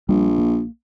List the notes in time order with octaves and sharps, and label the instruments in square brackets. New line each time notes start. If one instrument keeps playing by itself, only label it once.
[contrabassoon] A#1 [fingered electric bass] G3
[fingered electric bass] A#3